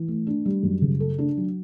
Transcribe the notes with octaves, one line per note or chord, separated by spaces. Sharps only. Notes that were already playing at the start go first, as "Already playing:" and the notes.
Already playing: E3
A3
D4
G3
F#2
C#3
A4
D4
F#3